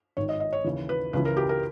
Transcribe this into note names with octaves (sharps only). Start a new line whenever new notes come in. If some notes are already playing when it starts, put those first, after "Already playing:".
G#1 G#2 D#3 C#5
D#5
D#5
C#5
D#2 C#3 E3
B4
C#2 C#3 E3 B4
A#4
G4
A#4